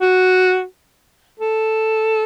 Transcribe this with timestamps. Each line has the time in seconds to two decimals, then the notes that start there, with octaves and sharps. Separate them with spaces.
0.01 F#4
1.40 A4